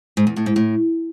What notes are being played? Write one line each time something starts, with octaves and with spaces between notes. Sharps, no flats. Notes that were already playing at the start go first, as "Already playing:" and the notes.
G#2
E2
A2
G#2
A2